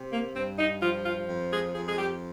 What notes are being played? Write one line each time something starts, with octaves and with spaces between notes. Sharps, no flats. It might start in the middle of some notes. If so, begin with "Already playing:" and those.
Already playing: C3
A#3
G2 C4
D#4
F3 F4
F4
F2
G#4
F2 G#4
G#4
G4